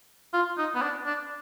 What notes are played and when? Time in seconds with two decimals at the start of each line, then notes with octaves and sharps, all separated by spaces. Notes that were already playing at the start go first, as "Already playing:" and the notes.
0.34 F4
0.58 D#4
0.75 B3
0.82 D4
1.06 D4